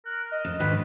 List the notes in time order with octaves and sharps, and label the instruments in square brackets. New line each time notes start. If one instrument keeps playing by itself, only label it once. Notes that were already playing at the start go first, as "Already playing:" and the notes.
[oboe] A#4 [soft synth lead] F#6
[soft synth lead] D#5
[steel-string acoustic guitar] F2
[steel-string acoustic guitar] G#2 D3 D#3 [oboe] B4